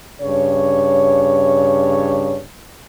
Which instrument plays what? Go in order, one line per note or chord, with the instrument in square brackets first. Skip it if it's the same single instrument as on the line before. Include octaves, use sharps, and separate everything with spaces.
[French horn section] G2 C#3 C#5